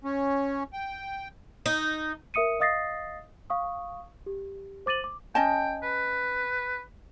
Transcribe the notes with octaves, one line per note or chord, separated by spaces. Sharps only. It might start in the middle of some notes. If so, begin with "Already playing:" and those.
C#4
G5
D#4
A#4 E5 D#6 C#7 D#7
D#5 F5 D#6 A6 A#6 C7
F5 C#6 D#6
G4
C5 D6 A6 D#7 F#7
D6
C#4 D#5 G5 A5
B4